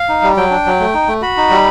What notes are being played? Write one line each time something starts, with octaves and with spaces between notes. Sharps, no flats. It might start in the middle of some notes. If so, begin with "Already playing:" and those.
Already playing: F5
D#4
G3
F#3 G5
D4
F#3
A3
D#4
A3
F#4 B5
D#4
G3